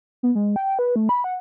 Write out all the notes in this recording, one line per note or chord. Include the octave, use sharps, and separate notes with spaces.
B3
G#3
G5
B4
A3
B5
F#5